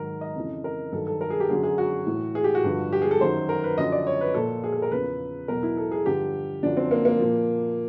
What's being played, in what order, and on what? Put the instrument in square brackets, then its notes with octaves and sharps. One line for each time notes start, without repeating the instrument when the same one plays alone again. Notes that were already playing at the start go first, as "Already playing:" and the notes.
Already playing: [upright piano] G#2 D#3 F#3 A#4
D#5
F2 C#3 E3
A#4
G2 D#3 F#3 A4
A4
A#4
G#4
G4
F#2 D3 F#3 G#4
G#4
F#4
A2 E3
G#4
G4
F#4
G2 D3 F3
G4
G#4
A4
F#2 D#3 F#3 C5
A#4
B4
F#2 D3 F3 D#5
D5
C#5
B4
A#2 F3 A4
G#4
A4
A#4
E2 C#3 F3 B4
E2 B2 F#3 A#4
E4
A4
G#4
G2 D3 F3 G4
F#2 D3 F3 D4
C4
A#3
A#3
A#2 F3